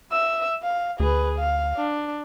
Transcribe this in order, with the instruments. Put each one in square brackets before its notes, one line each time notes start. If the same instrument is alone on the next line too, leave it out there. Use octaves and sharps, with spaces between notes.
[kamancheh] E5 E6
F5
[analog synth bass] D2 [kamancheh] G#4 B4
[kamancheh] F5
D4